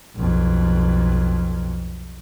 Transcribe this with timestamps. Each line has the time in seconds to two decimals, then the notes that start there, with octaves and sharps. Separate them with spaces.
0.15 B1 F2